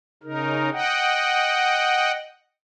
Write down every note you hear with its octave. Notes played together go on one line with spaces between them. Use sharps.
C#3 D#4 A#4
D#5 F#5 G5